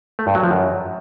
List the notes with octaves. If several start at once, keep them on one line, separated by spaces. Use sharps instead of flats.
A3
G2
F#3
F3
F#2